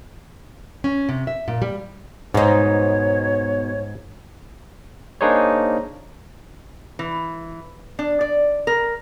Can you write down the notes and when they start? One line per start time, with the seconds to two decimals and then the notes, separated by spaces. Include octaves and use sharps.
0.84 C#4
1.09 C3
1.27 E5
1.48 A#2
1.62 G3
2.34 G#2 B2 D#4 C5 C#5
5.21 A#3 D4 D#4 G#4 C5 C#5
6.99 E3
7.99 D4
8.21 D5
8.67 A#4